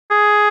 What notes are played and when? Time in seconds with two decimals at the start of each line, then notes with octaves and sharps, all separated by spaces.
0.11 G#4